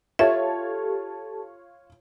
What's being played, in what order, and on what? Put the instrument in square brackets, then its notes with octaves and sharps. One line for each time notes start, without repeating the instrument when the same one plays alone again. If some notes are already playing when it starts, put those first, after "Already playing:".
[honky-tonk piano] F4 C#5 [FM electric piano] G4 A4 A5 [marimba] E5